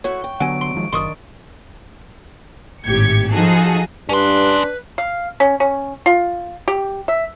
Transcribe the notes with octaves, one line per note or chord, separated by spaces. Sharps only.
A3 E4 F#4 C#5 C#6
G5
D3 F#3 B3 F#5 G#5 D7
C6 D7
D#3 F3 G#3
F#1 D#3 D4 C6 C#6 D#6
G#1 A2 G4 G#6 C#7
F3 D#4 F#4 G#4 A4
G2 C#4 D4 B4 C6
F5
C#4
C#4
F4
G4
E5